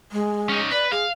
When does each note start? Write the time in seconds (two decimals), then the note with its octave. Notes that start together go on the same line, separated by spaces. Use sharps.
0.12 G#3
0.49 C#4 D#4
0.72 B4 D5
0.91 G#4 F5